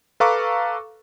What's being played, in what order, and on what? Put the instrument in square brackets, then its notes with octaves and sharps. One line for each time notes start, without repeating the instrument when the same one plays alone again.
[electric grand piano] A4 B4 F5 A#5 C#6 D6